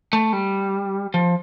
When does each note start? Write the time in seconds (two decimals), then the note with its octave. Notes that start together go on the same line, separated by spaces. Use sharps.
0.13 A3
0.33 G3
1.14 F3